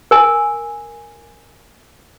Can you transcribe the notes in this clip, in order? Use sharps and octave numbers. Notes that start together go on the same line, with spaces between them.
A#4 G#5